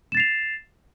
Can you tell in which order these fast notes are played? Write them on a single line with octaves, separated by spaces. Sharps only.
E7 A6 C7 F7